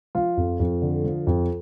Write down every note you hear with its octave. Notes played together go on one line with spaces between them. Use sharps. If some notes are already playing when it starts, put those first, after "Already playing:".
F3 F4
F2
F2
D3
F3
F2